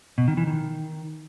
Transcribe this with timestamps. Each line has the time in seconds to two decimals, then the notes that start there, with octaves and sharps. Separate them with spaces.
0.18 B2
0.28 D#3
0.37 E3
0.47 D#3